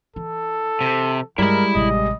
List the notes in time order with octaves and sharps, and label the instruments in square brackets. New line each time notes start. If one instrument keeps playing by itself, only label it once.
[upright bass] E3 [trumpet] A4
[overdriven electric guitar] C3
[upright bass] G2 [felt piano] G3 G#3 [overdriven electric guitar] E4 B5 [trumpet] A#4
[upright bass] A1 C3 [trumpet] D#5